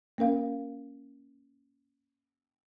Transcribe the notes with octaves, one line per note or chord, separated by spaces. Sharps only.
A#3 C#4 A#4 F5